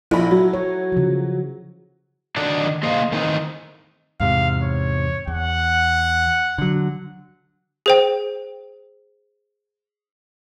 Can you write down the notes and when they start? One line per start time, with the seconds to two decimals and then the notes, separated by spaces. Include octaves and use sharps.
0.11 A#1 E4 A4 B5
0.31 F#3
0.53 C#5
0.92 C#3 F3
2.36 D#3 D4 D#4 F#4 A4 D5
2.83 A#3 G#4 C5 D#5 F5
3.12 D#3 E3 A3 C4 D#4
4.20 E2 G#2 C3 F5
4.63 C#5
5.27 E2 F#5
6.58 D3 F#3
7.86 G#4 C5 G5